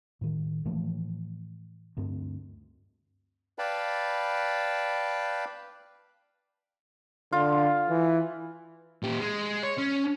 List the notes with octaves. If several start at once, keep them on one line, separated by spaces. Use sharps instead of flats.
A2 D#3
A2 E3 F3 A3
D2 G2 C4
B4 D5 F5 G5 A5 B5
D3 F4
E3
A#2 G4
G#3
C#5
C#4